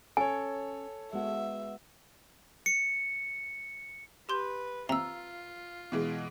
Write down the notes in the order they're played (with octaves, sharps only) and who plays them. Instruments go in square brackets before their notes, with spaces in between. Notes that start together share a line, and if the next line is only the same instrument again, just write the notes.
[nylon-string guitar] C#4 [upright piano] A4 C#5 [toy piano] G#5
[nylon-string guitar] G#3 B3 F#4 [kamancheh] E5
[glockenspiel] C#7
[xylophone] G4 C6 G6 [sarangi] B4
[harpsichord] C3 [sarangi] F4 [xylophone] A#5 E6
[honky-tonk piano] B2 E3 G#3